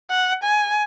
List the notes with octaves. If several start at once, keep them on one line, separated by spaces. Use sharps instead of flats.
F#5
G#5